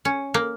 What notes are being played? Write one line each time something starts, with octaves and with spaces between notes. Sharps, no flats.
C#4
A#3